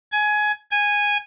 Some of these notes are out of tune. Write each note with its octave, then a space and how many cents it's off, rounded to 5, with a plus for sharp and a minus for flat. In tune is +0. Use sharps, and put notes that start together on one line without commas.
G#5 +20
G#5 -10